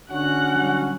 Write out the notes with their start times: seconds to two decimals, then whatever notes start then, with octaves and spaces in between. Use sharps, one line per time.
0.10 D3 C#4 F#4 F#5
0.54 C#3 F#3 G3